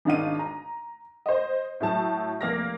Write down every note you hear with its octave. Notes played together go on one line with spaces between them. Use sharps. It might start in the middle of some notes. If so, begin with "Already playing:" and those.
G#1 D4 D#4 F5 D#7
A#5
C5 D#5
A2 F#3 A5
F1 A#3 F6 A#6